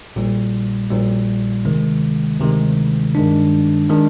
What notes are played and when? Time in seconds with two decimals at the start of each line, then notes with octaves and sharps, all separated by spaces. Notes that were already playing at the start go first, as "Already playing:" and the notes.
0.16 A#1 A#2 G3
0.90 A#1 A#2 G3
1.65 D2 C3 D#3 G#3
2.40 D2 C3 D#3 G#3
3.15 G2 D#3 G#3 D4
3.90 D#3 G#3 D4